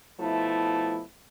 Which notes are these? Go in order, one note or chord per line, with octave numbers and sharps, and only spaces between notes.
B2 F3 A3 E4